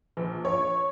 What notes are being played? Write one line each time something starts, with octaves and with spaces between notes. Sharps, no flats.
A#1
C#5